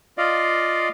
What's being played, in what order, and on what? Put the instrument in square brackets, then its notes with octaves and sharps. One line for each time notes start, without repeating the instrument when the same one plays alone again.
[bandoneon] F4 D5 D#5 F5